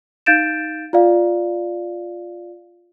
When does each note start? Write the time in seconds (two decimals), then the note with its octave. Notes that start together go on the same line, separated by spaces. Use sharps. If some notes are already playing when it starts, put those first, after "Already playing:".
0.26 D#4 F5 G6 A6 D7 E7
0.93 F4 D5 F5